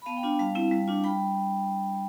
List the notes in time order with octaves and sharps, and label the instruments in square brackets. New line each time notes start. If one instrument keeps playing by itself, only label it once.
[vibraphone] B5
B3 F5 A5
G5 B5
D4 F4
G3 F5 A5
C4 E4
G3
D4 F4
G3 G5 B5